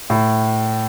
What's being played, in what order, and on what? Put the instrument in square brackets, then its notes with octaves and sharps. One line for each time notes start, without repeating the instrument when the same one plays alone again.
[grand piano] A2